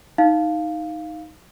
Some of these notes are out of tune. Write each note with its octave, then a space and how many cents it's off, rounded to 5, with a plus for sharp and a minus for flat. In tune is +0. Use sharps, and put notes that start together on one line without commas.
D#4 +10 F5 +0